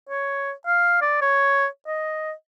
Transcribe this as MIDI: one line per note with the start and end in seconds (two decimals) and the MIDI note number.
0.09 0.51 73
0.67 1.01 77
1.02 1.17 74
1.22 1.66 73
1.87 2.32 75